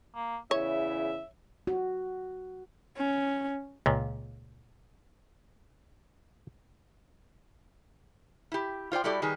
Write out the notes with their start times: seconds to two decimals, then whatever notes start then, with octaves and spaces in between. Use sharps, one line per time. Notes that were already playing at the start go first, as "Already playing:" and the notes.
0.16 A#3
0.51 E2 C#3 E4 C#5 E5
1.67 F#4
2.97 C#4
3.86 C#2 A#2
8.52 E4 G4
8.92 F4 C5 D5 G5
9.04 G3 E4 F#4 G4 A4 D5
9.22 D#3 G3 G#4 B4